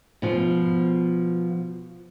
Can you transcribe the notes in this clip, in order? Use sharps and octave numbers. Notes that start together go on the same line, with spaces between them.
B2 F3